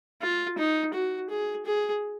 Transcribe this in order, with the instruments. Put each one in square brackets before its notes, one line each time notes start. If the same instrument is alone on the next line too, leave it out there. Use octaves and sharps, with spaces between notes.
[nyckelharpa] F4
D#4
F#4
G#4
G#4